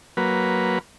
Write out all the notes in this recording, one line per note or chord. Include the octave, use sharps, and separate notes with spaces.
F#3 A#3 B4